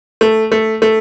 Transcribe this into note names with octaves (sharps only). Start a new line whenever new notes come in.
A3
A3
A3